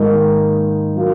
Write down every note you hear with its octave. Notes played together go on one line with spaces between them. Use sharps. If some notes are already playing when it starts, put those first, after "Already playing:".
Already playing: G#2 D#3 A#3 D#4
F#3 A#3 F4